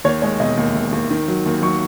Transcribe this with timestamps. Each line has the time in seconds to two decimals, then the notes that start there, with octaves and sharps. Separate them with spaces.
0.04 D#2 C#5
0.22 G#3 C#5
0.40 E1 D#5
0.57 D#2
0.75 E1
0.92 D#2
1.11 D#3
1.28 F#3
1.46 D#2
1.62 F#3 C#6